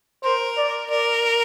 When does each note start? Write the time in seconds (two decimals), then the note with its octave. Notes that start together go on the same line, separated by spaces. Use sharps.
0.23 A#4 C5
0.57 D5
0.90 A#4 D5